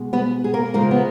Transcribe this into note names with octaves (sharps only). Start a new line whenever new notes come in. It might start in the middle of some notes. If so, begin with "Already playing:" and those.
Already playing: B2 G#3
B3 B4
G#4
A#3 A#4
C#3 F3 G#3 A#3 A#4
B3